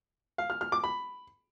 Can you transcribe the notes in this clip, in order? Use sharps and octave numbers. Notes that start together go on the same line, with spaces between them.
F5
F6
F6
D6
B5